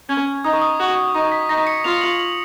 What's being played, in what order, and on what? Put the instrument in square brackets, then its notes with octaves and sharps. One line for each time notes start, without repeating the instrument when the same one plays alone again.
[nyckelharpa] C#4 [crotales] G#6
[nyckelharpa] D#4 [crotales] D#6
[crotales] C#6
D#6
[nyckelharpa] F#4
[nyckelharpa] D#4 [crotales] C#6
[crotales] B6
[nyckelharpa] D#4 [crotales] A#6
[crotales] C#7
[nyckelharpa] F4 [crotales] F7
[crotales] F#7
F#7